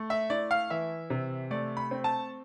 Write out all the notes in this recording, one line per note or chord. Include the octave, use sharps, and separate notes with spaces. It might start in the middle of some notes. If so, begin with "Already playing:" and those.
Already playing: A3
E5
E4 D5
F5
E3 E5
C3
A3 D5
B5
C4
A5